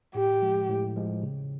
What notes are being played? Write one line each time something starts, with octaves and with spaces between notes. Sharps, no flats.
A2 G4
F3 G#3
A2
F3 G#3
C#3